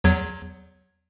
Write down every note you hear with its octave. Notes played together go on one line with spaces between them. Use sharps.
E2 F#3 G#6